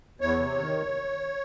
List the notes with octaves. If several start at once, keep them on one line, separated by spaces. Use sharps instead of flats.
E2 C#5
C3
D#3